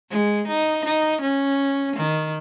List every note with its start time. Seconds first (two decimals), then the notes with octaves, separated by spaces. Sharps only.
0.10 G#3
0.48 D#4
0.85 D#4
1.22 C#4
1.97 D#3